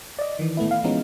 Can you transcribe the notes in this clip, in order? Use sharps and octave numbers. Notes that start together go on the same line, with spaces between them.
D5 D#5
D#3 E3
A2 A3 B3 E4
F5
E3 F3 G#3 B3 C#4 D#4